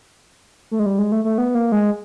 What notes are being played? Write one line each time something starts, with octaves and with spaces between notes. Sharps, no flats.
A3
G#3
G3
G#3
A3
A3
B3
A#3
G#3